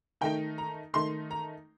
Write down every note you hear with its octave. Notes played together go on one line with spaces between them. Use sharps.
D#3 A3 D#4 G5
A#5
D#3 A3 D#4 C6
A#5